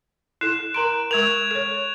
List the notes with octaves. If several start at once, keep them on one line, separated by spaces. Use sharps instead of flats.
E4 A4 F#6 E7
A#4 A#5 C6 D7
G#3 A#4 C#6 G#6 F7
A4 C#5